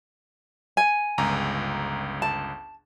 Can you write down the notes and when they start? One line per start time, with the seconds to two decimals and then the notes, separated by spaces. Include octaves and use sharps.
0.77 G#5
1.18 G1 C#2 A#5
2.22 A5